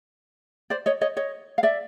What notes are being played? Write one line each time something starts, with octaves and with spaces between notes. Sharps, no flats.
C5 D5
C#5 D#5
C#5 D#5
C#5 D#5
F5
D5 E5